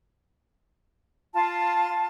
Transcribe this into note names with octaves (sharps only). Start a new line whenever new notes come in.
F4 A5